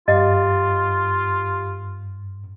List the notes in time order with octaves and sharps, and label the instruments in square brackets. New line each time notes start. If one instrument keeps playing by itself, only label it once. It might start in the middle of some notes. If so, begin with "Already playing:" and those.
[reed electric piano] G2 [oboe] F4 [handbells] G4 F5 [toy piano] D#5